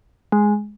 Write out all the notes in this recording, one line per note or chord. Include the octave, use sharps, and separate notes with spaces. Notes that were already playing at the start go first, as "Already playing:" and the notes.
G#3